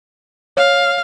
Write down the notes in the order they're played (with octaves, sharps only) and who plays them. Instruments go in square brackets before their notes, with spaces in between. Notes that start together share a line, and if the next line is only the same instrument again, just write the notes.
[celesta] C#5 [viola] F5